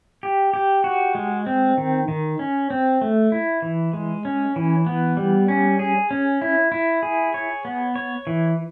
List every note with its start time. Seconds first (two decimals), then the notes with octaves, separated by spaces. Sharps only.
0.23 G4
0.54 G4
0.84 F#4
1.15 G#3
1.46 C4
1.78 D#3
2.08 D#3
2.39 C#4
2.70 C4
3.01 A3
3.32 E4
3.62 E3
3.93 G#3
4.25 C#4
4.56 E3
4.86 B3
5.17 G3
5.48 C#4
5.79 G#4
6.11 C#4
6.42 E4
6.72 E4
7.03 G#4
7.34 C#5
7.65 B3
7.95 C#5
8.27 E3